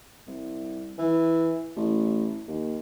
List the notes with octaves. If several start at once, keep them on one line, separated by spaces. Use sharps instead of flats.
C2
E3
A1
D#2